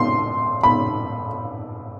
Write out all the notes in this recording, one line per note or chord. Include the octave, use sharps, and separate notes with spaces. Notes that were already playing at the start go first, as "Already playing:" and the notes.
Already playing: C6
B5